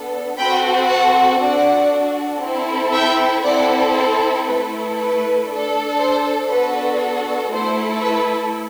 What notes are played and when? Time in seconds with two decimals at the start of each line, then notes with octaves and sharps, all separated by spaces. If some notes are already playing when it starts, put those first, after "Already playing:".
Already playing: B3 D4 A4
0.38 C4 F#4 A4 G5 B5
0.88 F#5 A5
1.40 D4 F#4 A4 D5 F#5
2.41 C4 E4 A4
2.93 E5 G5
3.43 C4 E4 A4 D5 F#5
3.95 C5
4.46 A3 E4 A4 B4
4.97 B4
5.48 D4 A4
5.99 C5
6.49 B3 D4 F#4 A4 B4
7.52 A3 E4 A4 C5
8.02 B4